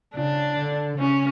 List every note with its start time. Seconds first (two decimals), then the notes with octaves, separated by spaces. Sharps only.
0.15 C#3 D4
0.58 D3
0.99 C#3 C#4